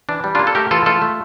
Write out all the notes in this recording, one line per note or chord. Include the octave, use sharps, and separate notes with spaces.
E3 D4
G3
D4 F4
A#3
A4
A3 G4 A#4
E3 F4 A4
A3 F4 A4
A3